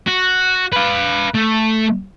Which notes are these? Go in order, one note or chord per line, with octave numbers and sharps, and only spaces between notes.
F#4
B4 F5
A3